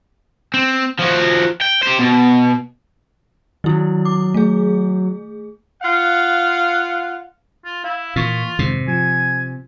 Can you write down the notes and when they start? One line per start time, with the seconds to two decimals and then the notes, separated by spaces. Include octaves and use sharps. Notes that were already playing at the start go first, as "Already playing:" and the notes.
0.54 C4
0.99 F3 F#4
1.62 G5
1.83 G4 C5
2.00 B2
3.64 D#3 F#3 E4
4.05 D6
4.34 A3 G#4
5.82 F4 F5 F#5
7.65 F4
7.84 E4 F5
8.16 A#2 E3 F4 C#6
8.59 F2 G#2 C3 D#3
8.88 F3 G#5